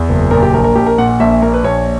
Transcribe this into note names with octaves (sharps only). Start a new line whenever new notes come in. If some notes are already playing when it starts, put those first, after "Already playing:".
Already playing: E2
F#1
A#2 A#4
G4
A#1 A#4
A#4
A#1 G4
A#4
A#2 F#5
F#5
A#1 E5
E5
A#2 A#4
B4
A#1 C#5